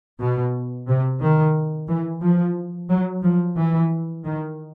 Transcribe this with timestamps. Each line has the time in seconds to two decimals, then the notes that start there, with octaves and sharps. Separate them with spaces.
0.19 B2
0.87 C3
1.20 D#3
1.88 E3
2.22 F3
2.89 F#3
3.23 F3
3.57 E3
4.24 D#3